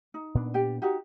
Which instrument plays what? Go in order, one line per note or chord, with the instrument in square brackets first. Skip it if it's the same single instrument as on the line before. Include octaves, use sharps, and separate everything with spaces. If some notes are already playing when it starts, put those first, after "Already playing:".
[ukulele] D#4
[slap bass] A#2 B3 D4
[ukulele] G4 D5 G5
D#4 F#4 G4